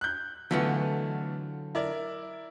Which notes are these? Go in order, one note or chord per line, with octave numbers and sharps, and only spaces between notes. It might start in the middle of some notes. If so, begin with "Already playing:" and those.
F#6 G6
D3 E3 F#3 A3 B3 F4
E4 A#4 D5